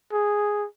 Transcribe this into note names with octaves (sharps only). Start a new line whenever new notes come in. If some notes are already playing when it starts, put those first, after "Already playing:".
G#4